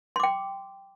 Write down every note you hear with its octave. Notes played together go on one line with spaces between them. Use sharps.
G5 C6 D6